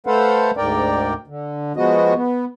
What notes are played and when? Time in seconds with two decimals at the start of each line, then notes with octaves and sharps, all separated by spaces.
0.07 A3 A4 B4 C5 F5 F#5
0.57 D2 G#2 A#4 D5 G5
1.27 D3
1.77 F3 G#3 B3 F#4 D#5
2.15 B3